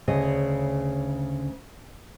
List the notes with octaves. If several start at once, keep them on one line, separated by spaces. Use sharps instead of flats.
D2 C#3 D#5